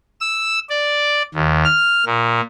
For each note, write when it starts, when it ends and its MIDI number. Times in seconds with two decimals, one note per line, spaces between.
0.21 0.59 88
0.70 1.23 74
1.34 1.64 39
1.65 2.05 89
2.06 2.41 46